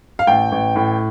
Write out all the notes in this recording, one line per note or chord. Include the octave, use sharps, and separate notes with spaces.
F5
A1 G5
A1
A2